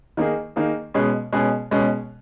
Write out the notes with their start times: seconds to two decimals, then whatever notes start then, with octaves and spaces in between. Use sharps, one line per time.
0.17 D#3 A#3 D#4 G#4
0.56 D#3 A#3 D#4 G#4
0.94 B2 G#3 C#4 G#4
1.33 B2 G#3 C#4 G#4
1.71 B2 G#3 C#4 G#4